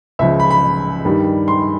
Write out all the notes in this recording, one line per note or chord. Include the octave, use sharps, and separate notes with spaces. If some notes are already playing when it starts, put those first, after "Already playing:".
C#2 C#3 F3 E5
B5
B5
G2 D#3 G3
C6